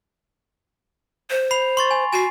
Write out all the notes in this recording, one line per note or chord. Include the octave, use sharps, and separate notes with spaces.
C5
B5 C7 F7
C6 C#6 A6
G#5
F#4 G#5 C7